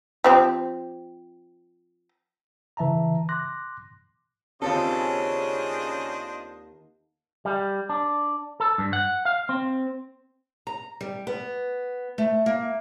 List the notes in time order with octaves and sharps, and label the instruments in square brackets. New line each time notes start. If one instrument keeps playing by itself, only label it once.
[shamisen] F3 C4 G4
[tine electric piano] C#3 E3 E5 A5 A#5
C6 D6 F#6 A#6
[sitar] D#2 A4 [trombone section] C#3 [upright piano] C4 F4 [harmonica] D4 C5 D#5
[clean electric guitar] G3
D4
A4
G2
F#5
F5
C4
[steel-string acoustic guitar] A#5
G3
B3
A3
A#3